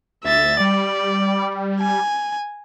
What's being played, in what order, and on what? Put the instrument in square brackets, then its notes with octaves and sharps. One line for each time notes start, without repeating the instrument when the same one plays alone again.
[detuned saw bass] D2 [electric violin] E5 A6
[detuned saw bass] G3 [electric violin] D5
[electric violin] G#5